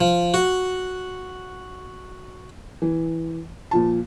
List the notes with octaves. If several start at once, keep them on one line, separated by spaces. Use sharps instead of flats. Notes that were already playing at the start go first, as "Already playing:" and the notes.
F3
F#4
E3
A#2 F3 A5